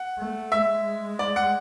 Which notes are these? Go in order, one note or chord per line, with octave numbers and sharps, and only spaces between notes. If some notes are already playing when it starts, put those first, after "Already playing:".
Already playing: F#5
A3
G#3 E5
D5
F#5